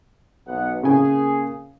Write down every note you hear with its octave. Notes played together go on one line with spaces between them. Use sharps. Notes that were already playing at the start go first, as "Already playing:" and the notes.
B1 B3 F#5
C#3 A#3 G#4 G#5